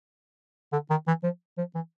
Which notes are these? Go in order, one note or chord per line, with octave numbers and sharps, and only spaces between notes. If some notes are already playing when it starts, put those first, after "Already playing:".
D3
D#3
E3
F3
F3
E3